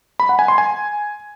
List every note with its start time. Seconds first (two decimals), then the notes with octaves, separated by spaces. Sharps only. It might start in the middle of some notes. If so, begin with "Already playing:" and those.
0.20 B5
0.29 F#5
0.39 G#5
0.48 C6
0.58 G#5